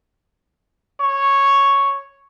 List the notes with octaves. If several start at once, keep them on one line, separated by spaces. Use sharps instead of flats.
C#5